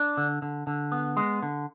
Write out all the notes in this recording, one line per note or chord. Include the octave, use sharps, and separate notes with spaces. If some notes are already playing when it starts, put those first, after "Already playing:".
Already playing: D4
D3
D3
D3
B3
G#3
D3